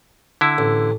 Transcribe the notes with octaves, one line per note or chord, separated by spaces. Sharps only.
D3 E4
A1